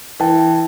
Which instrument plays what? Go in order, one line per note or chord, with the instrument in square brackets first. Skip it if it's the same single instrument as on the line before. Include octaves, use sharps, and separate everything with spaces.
[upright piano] E3 [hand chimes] G5 A5